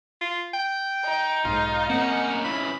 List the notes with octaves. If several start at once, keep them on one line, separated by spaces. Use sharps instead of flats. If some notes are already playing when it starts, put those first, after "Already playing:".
F4
G5
D#4
B1 G#2 F4
A#3 C4 C#4 F#5
C#3 E3 B5